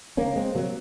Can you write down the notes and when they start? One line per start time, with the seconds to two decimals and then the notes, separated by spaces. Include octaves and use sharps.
0.17 C#2 A#3 C#4
0.36 G#3 C4
0.55 C3 F#3 A#3